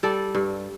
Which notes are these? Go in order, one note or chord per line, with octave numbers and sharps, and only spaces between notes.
G3 A4 D5
G2